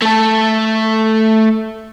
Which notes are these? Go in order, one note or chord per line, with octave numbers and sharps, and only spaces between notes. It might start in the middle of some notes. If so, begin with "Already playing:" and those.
A3 A4